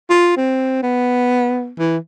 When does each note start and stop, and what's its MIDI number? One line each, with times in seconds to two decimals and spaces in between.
0.10 0.32 65
0.37 0.78 60
0.83 1.71 59
1.79 1.97 52